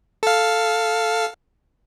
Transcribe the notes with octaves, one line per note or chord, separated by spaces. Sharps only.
A4 F5